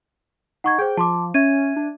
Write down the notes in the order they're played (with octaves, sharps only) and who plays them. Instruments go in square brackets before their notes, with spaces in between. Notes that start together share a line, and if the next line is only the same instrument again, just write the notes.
[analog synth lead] D#4 [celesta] F#5 C#6 G#6
[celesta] G#4 C5 [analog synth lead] G5
[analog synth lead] F3 [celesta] A5 C6 D6
[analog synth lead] C#4 [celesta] E5 G#6 D#7
[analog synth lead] D4